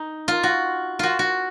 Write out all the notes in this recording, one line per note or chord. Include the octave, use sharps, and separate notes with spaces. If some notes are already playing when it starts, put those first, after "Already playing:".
Already playing: D#4
F4
F#4
F4 F#4
F#4